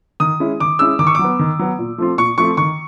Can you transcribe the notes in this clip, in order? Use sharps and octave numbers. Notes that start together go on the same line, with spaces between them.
D#3 D#6
G#3 C#4 E4
D#3 D6
G#3 C#4 E4 E6
D#3 D6
C#6
F#3 D6
B3
D#3
F#3 B3
A#2
F3 A3 C4 F4
A#2 C#6
F3 A3 C4 F4 C#6
D#3 C#6